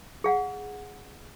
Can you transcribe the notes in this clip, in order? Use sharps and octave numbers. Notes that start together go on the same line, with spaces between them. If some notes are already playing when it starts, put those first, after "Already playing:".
G#4 F5 F#5